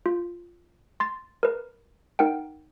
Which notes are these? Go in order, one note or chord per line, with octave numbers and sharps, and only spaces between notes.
F4
C6 A6
A#4 B4
D#4 A#4 F#5 G5